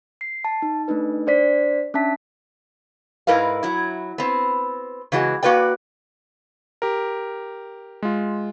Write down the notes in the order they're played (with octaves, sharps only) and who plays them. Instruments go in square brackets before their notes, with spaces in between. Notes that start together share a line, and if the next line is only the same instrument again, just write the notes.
[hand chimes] C7
A5
D#4
A3 D4 D#4 B4
D4 C5 D5 B6
C#4 D4 E5 A5 B6
[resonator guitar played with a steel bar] G#2 E4 A#4 B4 F5
F#3 E4
B3 C4
C#3 E3 G#3 F#4
A#3 F#4 B4 D5 G5
[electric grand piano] G4 A#4
G#3 F4